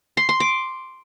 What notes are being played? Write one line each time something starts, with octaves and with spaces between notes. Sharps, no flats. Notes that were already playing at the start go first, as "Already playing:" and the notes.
C6
C6
D6